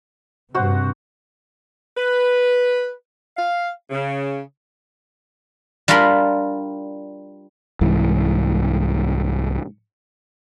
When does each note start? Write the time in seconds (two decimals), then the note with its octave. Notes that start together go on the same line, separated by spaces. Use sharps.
0.54 G2 C3 F#4 C5 F#5
1.97 B4
3.37 F5
3.90 C#3
5.88 G3 D4 F4 A#4 B5 C6
7.81 C2 G#2 E3